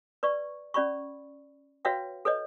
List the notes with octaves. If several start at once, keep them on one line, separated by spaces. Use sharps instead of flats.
B4 D5 C#6
C#4 D5 B5 C#6
F#4 B4 C#5 E5 F5 G5
A4 B4 C#5 D#5